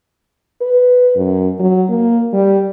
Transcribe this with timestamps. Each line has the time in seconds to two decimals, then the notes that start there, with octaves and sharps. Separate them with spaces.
0.61 B4
1.15 F#2
1.59 F#3
1.90 A#3
2.33 G3